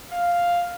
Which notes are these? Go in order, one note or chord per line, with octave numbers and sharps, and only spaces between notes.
F5